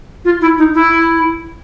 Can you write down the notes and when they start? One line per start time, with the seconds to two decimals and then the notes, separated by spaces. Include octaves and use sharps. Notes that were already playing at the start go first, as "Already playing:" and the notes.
0.25 F4
0.41 E4
0.58 D#4
0.75 E4